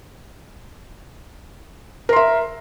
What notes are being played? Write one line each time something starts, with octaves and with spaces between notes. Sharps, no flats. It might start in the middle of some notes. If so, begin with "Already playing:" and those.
A#4 E5 C6